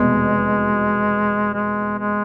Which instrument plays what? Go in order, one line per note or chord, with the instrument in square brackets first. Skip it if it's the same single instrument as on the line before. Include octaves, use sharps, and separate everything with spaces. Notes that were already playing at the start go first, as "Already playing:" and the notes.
Already playing: [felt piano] F1 E2 B2 [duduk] G#3
[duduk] G#3
G#3